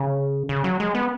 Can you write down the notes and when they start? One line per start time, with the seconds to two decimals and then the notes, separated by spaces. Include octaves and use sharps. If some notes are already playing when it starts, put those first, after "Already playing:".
Already playing: C#3
0.49 C#3
0.64 F#3
0.80 G#3
0.95 B3